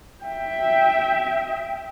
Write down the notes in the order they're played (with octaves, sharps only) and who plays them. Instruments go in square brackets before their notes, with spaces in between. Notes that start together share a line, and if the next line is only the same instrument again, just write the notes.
[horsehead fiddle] E5 G5